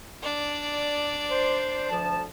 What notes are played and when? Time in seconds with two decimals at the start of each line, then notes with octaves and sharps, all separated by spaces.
0.23 D4 D5
1.30 C5
1.89 D2 F3 A5